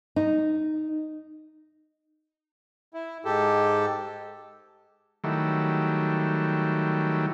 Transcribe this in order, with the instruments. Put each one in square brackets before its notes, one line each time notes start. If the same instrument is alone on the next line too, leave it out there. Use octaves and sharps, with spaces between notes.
[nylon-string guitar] D#4
[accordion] E4
G#2 G4 A4
[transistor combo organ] D#3 F#3 G3 A3 E4